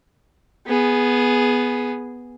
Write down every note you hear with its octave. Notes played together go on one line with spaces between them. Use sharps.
B3 G#4